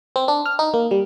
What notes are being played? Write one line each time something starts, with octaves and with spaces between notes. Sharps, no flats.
C4
D4
F6
D#4
A#3
G3